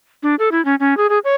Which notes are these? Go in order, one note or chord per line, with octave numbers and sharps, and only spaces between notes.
D4
A4
E4
C#4
C#4
G#4
G#4
C#5